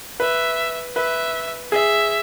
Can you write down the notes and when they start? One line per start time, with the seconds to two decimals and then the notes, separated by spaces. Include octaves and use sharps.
0.20 B4 E5
0.96 B4 E5
1.72 G#4 E5